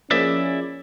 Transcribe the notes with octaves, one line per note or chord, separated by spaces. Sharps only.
F3 A#3 C#4 E4 G#4 D5 E5